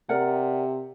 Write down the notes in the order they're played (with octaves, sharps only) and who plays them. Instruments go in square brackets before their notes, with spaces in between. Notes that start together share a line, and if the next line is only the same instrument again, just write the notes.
[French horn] C3 [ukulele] A#4 D5 F#5 A#5